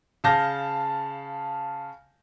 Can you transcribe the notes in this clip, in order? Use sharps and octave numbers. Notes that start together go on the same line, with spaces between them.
C#3 F5 A5 G6 A#6